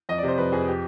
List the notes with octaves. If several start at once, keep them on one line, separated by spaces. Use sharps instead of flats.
F2 D#5
D5
C3 C5
F2 B4
F2 G#4
G4